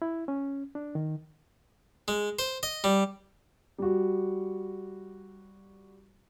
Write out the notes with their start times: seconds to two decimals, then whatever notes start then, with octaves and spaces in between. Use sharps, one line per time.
0.02 E4
0.28 C#4
0.75 D4
0.95 D#3
2.08 G#3
2.39 C5
2.63 D#5
2.84 G3
3.78 G3 F#4